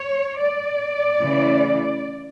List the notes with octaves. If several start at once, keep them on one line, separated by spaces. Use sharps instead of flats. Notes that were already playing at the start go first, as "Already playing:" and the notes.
Already playing: C#5
D5
C#3 E3 A3